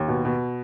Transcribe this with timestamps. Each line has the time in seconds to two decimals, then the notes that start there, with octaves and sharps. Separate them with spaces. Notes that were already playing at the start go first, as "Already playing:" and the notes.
Already playing: D#2
0.08 B2
0.25 B2